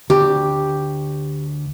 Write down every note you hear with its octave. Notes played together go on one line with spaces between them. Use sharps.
D2 G4